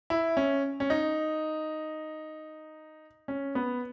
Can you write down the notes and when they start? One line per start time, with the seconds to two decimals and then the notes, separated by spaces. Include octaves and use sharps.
0.10 E4
0.37 C#4
0.80 C#4
0.90 D#4
3.28 C#4
3.55 B3